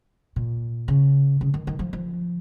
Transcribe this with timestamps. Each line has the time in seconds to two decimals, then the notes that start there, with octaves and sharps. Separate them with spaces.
0.36 A#2
0.88 C#3
1.41 C#3
1.54 D#3
1.67 D#3
1.79 F3
1.93 F3